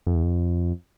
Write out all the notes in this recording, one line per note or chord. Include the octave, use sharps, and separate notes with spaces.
F2
E2
F2